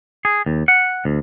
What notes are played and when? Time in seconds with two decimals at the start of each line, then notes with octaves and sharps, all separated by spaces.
0.25 G#4
0.46 D#2
0.68 F#5
1.05 D2